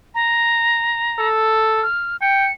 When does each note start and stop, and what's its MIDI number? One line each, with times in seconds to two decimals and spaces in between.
0.14 1.28 82
1.19 1.83 69
1.83 2.17 89
2.21 2.49 79
2.21 2.52 97